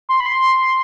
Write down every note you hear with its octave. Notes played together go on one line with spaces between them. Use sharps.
C6
B5
C6